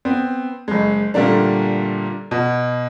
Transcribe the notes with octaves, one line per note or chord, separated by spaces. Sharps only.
B3 C4
F#1 G#3
A#2 D3 G3 A3 A#3 D4
B2